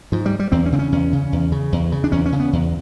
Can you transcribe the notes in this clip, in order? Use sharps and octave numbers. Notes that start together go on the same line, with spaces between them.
G#2 F3
G3
G3
E2 C4
C#4
C#3 C4
C#4
E2 C#4
C#3
E2
C#3
E2
C#3
D4
E2 C#4
C#4
C#3
B3
E2